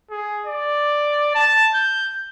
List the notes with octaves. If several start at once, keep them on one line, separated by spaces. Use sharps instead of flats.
G#4
D5
A5
G6